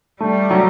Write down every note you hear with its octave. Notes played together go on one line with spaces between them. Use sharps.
G3 A3
F#3